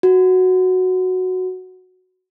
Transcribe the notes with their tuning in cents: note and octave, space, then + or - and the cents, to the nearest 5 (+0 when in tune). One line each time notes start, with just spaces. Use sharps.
F#4 -5